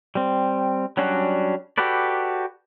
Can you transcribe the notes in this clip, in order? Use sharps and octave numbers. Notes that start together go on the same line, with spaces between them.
G3 C4
F#3 G3 C#4 D4 F#4
F#4 G4 A4 B4 D5